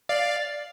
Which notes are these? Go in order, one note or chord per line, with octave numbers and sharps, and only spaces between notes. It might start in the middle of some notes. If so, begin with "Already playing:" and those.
D5 F5